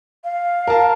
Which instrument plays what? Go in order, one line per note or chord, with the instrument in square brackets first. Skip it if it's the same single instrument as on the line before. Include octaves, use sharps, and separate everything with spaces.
[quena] F5
[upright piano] A#4 A5